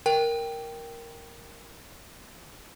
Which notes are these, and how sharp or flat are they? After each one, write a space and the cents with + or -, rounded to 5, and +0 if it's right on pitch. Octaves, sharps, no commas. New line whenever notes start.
A#4 +0 G5 +0